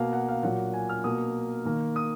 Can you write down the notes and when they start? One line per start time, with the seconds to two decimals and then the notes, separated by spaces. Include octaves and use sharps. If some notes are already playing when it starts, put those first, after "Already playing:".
Already playing: B2 A#3 F5
0.13 F#5
0.28 F5
0.43 A#2 F#3 A#3 F#5
0.74 G#5
0.89 F6
1.04 B2 A#3 D#6
1.65 D#3 A#3
1.96 D#6